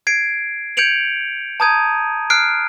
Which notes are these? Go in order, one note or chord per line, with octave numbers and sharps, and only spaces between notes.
G#6 C7 D7
G6 G#6 C#7 D7 F7 F#7
A5 A#5 D#6 G6 G#6 D#7
F6 F#6 C7 D7